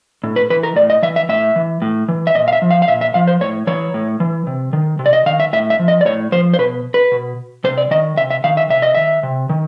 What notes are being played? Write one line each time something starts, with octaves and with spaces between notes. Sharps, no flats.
A2
B4
E3 B4
A#4
A2 D5
D#5
E3 E5
E5
A2 E5
E3
A2
E3
E5
A#2 D#5
F5
E5
F3
F5
F5
A#2 E5
E5
F3 F5
C5
A2 C#5
E3 C#5
A2
E3
C3
D#3
C3
D5
D#5
D#3 F5
E5
A2 E5
E5
F3
D#5
D5
A2 C#5
F3 C5
C5
B2 B4
B4
B2
C3 C5
D5
D#3 D#5
C3 E5
E5
D#3 F5
E5
C3 E5
D#5
D#3 E5
C3
D#3